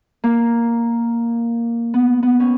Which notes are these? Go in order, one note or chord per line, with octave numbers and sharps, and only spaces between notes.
A#3
B3
B3
C#4